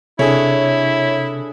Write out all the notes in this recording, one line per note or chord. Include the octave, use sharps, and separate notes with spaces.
C3 D4 E4 G#4 A4 C#5